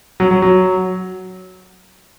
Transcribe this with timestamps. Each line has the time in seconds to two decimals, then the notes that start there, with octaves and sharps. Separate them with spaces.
0.20 F#3
0.31 F#3
0.42 F#3